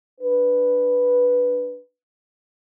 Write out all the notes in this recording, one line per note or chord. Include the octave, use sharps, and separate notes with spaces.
D4 B4